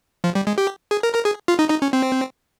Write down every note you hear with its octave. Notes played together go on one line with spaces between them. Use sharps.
F3
G3
G#3
G4
G#4
A#4
A#4
G#4
F4
D#4
D#4
C#4
C4